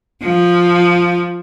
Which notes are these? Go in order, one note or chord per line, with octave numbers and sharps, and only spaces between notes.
F3